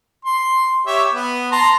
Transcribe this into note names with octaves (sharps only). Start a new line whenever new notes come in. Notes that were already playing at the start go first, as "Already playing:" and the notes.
C6
G4 C#5 E5
B3
A5 A#5 C6